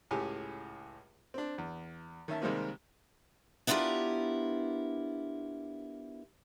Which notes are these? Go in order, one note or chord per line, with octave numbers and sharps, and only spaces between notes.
C#2 A2 G4 G#4 G#5
C4 D4
E2
D#3 C#4 E5 A5
C3 D#3 G3 G#3 A#3 C4
B3 D4 E4 F4 G4 A#4